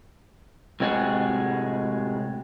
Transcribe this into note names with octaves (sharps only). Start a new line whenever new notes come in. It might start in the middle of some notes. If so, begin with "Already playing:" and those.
A2 C3 G#3 D#4 F#4 G#4